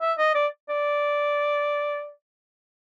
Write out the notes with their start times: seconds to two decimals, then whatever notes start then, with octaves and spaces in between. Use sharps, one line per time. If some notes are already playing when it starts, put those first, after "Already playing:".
0.01 E5
0.18 D#5
0.35 D5
0.69 D5